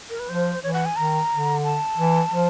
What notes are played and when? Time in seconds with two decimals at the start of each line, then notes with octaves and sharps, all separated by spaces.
0.10 A#4
0.19 B4
0.29 F3 C5
0.63 E3 C#5
0.73 F#5
0.85 G#5
0.96 D#3 A#5
1.30 D3
1.64 A5
1.98 E3
2.31 F3